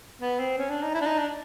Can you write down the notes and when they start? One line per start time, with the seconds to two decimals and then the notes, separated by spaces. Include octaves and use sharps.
0.21 B3
0.40 C4
0.58 C#4
0.70 D4
0.83 D#4
0.94 E4
1.01 D4
1.06 D#4
1.18 D4